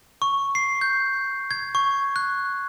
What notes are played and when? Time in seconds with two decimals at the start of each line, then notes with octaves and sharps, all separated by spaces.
0.22 C#6
0.55 C7
0.81 G6
1.51 G#6
1.75 C#6
2.16 F#6